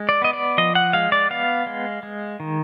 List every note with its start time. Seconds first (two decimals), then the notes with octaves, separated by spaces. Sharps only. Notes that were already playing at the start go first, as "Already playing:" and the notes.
Already playing: G#3
0.09 D5
0.22 B3 D#5
0.33 D5
0.58 F3 D#5
0.75 F#5
0.93 G#3 F5
1.12 D5
1.30 B3 F5
1.66 G#3
2.03 G#3
2.40 D#3